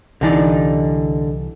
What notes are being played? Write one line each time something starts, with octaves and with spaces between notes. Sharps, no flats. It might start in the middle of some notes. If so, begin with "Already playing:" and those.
C2 D3 E3 D#4 D5